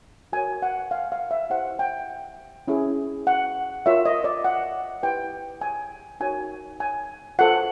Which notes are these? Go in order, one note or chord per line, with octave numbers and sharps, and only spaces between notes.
F#4 A#4 C#5 G#5
F#5
F5
F5
E5
E4 G4 C5 F#5
G5
C#4 E4 G#4
F#5
F4 A#4 C#5 E5
D#5
D5
F#5
E4 G4 B4 G5
G#5
D#4 F#4 A#4 C#5 G#5
G#5
F4 A4 C5 F#5